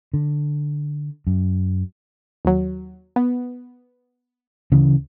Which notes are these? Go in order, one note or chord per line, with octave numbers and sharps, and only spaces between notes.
D3
F#2
D#2 F#3
B3
D2 C#3 E3